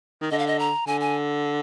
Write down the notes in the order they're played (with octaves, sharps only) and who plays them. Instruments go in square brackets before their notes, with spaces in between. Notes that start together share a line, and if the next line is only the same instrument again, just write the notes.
[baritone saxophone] D#3
[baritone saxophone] D3 [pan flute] D#5
[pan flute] F5
D#5
A#5
[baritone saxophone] D3 [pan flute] G#5
[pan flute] G#5